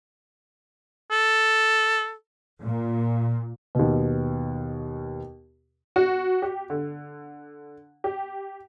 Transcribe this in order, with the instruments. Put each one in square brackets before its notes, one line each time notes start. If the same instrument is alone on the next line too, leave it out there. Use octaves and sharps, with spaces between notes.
[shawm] A4
[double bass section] A#2
[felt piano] D#2 B2
[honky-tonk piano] F#4
G4
D3
G4